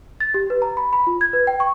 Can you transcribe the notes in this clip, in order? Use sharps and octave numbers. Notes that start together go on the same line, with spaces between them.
A6
G4
B4
A#5
B5
B5
F4
G#6
B4
G5
C#6